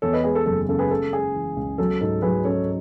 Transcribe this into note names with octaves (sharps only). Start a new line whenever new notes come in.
E2 A4 C#5
B4 D#5
G#3 G#4 B4
A4
F#1 A4
C#3 A4
G#4 B4
G#3 A4
G#3 G#4
E3
C#2
F#3 A4
G#2 A4
F#3 G#4 B4
C#4 A4 C#5